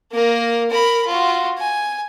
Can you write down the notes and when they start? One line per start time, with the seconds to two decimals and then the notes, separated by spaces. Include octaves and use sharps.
0.12 A#3 A#4
0.70 A#4 B5
1.07 F4 F#4
1.58 G#5